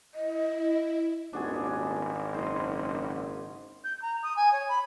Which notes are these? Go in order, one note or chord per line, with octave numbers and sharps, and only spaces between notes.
E4 D#5
D#1 G#1 D4 F#4 G#4
F#1 C5 D#5 C6
G6
A#5
D#6
G#5
C#5
B5